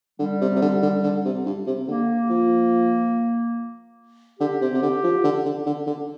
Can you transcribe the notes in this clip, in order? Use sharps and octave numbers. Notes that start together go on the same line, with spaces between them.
D3 G3
C3
C3
D3
D3
D3
C3
G2
C3
D3 A#3
F3
D3 G4
C3
C3
D3
F3
D3
D3
D3
D3